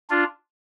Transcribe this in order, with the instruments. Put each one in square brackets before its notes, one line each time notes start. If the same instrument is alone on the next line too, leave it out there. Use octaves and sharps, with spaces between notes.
[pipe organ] D4 F4